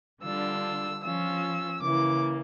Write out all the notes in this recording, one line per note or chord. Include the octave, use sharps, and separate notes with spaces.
D3 G3 D4 F4 E6
F3 C#4 F4 E6
C#3 E3 A#3 D6